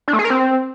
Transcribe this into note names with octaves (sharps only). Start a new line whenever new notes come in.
D4
A3
G#4
A#4
C4